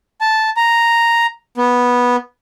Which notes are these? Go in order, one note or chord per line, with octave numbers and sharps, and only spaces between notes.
A5
A#5
B3